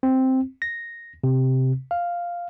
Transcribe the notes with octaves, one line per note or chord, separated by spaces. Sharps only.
C4
A#6
C3
F5